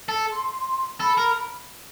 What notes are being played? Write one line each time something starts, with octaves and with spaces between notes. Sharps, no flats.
A4
C6
A4 B5
A#4